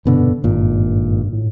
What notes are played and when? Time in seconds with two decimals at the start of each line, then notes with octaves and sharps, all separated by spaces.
0.05 F1 G2 B2 D3
0.44 G#1 G2 A#2
1.33 A2